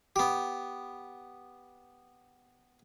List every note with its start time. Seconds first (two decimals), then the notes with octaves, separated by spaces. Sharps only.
0.16 B3 G4